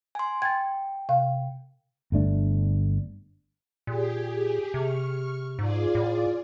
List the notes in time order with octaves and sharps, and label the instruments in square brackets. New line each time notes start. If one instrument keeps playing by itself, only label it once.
[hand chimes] G#5 C6
[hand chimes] G5 [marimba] G#6 A6
[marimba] C3 F5
[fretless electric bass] G1 A3 D4
[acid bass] A#2 [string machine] G4 G#4
[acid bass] C3 [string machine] C#6 F6
[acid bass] G#2 [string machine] F4 G#4 D5
[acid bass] A2